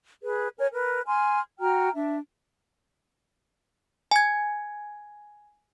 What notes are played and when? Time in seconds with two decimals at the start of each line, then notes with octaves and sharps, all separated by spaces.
0.22 G#4 B4
0.58 A#4 C#5 G#5
0.72 A#4 B4
1.04 G#5 C6 F6
1.59 F#4 G5 A#5 F6
1.95 D4 E5
4.11 G#5 G#6